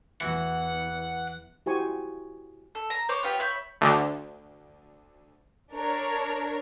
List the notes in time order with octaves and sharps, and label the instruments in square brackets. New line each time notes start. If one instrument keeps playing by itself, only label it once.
[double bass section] E2 B3 [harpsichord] E3 F#4 [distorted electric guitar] F#5
[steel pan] E4 F#4 G4 C5 G#5 C#6
[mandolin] A4
A#5
C5 C#5 D6
B3 F4 G4 C#5
C#5 E5 B5 G6
[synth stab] D2 D3
[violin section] D4 A#4 C#5